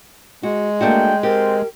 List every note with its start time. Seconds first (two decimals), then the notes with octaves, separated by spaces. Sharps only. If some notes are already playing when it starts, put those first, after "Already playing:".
0.43 G#3 F#4
0.81 A3 A#3 D4 F#4 G5
1.23 C4 G4 A#4